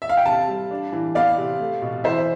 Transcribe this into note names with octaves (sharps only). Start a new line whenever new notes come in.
E5
F5
G5
C3 F5 A5
G3
D4
E3
B3 D5 F5
C3
A3
B2
E3 C5 E5